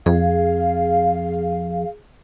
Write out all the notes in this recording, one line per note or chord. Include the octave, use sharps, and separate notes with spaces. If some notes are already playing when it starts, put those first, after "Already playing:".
F2 G#4 F5